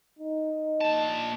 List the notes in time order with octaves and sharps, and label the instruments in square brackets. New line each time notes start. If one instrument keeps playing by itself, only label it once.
[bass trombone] D#4
[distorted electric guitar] A#2 A5